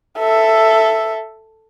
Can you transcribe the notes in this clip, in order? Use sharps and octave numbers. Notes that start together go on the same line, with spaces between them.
A4 E5